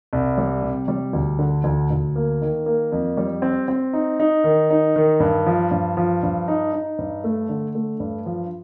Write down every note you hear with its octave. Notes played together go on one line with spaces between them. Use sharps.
C2
G3
C3
G3
D2
D3
D2
D2
A#3
D#3
A#3
F2
G3
C4
C4
D#4
D#4
D#3
D#4
D#3
G2
F3
G2
F3
G2
D#4
D#4
G2
A3
D3
A3
G2
F3